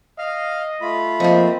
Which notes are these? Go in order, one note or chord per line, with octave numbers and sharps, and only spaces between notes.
D#5 F5 F6
A3 F4 B5
F3 A#3 C4 D#5